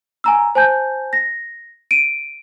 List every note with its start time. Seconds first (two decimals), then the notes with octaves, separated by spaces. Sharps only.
0.24 G#5 A#5 E6
0.55 C5 G#5 A5 G6
1.13 A#6
1.91 D7 D#7